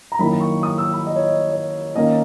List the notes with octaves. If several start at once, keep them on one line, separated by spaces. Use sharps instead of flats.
A#5
F#2 D#3 A#3 E4 B5
C#6
D#6
E6
B5
D#5
C#5
D#5
C#5
D#3 A#3 C#4 D#5